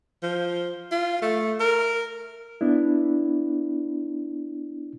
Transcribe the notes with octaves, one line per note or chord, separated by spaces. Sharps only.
F3
F4
A3
A#4
B3 D4 E4